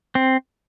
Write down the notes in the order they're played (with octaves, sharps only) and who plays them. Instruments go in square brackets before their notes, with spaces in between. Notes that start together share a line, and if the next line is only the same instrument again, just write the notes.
[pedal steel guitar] C4